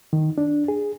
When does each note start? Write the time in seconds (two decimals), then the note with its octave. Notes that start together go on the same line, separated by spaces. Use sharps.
0.13 D#3
0.38 D4
0.68 G#4